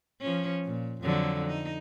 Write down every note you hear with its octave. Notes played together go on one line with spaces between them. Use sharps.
F3 C#4
A#2
F2 D3 F#3
D#4